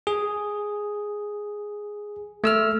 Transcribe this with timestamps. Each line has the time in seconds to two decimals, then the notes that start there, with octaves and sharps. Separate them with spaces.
0.07 G#4
2.44 A3 E6 F6